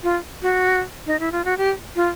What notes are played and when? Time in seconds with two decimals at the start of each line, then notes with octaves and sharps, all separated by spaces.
0.03 F4
0.42 F#4
1.07 D#4
1.20 E4
1.32 F4
1.45 F#4
1.57 G4
1.96 F4